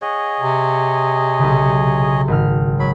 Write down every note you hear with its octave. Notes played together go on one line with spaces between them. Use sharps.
G#4 C#5 D#5 F#5
C3
B1 C#3
G#1 F6
F#3 B5 C7